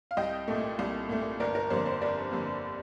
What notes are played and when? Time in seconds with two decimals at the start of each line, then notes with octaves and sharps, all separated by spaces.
0.11 F5
0.17 C2 D#5 G5
0.48 A#2 A3
0.79 C2
1.09 A#2 A3
1.40 G1 A#4 D5
1.55 A#4
1.70 F2 D3 G3 A#3 C5
1.86 C5
2.01 G1 A#4 D5
2.31 F2 D3 G3 A#3